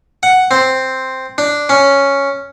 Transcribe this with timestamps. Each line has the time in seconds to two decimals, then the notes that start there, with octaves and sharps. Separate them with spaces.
0.23 F#5
0.51 C4
1.38 D4
1.69 C#4